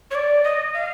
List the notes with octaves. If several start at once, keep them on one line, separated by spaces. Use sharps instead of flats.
C#5
D5
D#5
F5